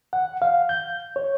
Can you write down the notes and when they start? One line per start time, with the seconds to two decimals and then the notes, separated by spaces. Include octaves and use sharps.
0.13 F#5
0.42 F5
0.69 G6
1.16 C#5